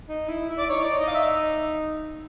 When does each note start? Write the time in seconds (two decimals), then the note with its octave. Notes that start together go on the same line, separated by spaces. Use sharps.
0.08 D#4
0.28 E4
0.49 E4
0.59 D5
0.69 D#4 C#5
0.84 D5
1.00 D#5
1.08 F5
1.15 E5